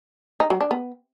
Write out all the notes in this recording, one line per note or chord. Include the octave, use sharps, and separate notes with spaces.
D#4
F#3
D4
B3